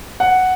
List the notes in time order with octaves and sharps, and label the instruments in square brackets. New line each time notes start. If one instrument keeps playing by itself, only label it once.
[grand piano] F#5